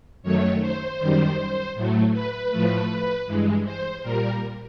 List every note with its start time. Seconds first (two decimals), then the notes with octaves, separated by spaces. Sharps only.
0.23 F#2 D#3 F#3 A3 C#5
0.61 C5
0.99 F#2 D#3 G3
1.75 A2 F#3 A3
2.13 B4
2.51 A2 F3 A3
3.26 G2 E3 G#3
3.64 C5
4.03 A#2 G3 A#4